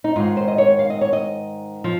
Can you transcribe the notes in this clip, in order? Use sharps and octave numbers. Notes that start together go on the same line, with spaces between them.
D#4
G#2 D#3 F4
C5
D#5
C#5
F5
D#5
C#5
D#5
F3